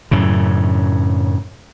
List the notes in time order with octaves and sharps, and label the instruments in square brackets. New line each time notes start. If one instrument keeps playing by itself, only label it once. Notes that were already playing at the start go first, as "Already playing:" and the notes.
[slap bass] F#2 A2 C#3